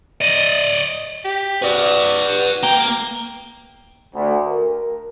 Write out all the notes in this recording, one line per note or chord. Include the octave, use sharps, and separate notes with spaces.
D5 D#5
G4
F#4 B4 D5
A#3 G5 A#5
D2
A#4